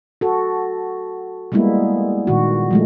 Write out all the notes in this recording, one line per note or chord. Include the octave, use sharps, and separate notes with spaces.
F#4 A4
G3 G#3 A#3 B3 E4
A#2 D#3 F#4
F3 G#3 A3